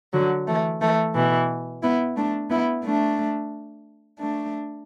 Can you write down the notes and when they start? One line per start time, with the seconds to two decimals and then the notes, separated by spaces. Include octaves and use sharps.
0.13 D3 F#3
0.47 E3 A3
0.81 E3 A3
1.15 B2 E3
1.82 B3 E4
2.16 A3 D4
2.49 B3 E4
2.84 A3 D4
4.19 A3 D4